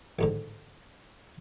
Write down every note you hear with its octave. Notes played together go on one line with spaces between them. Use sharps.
A1 G#2 D3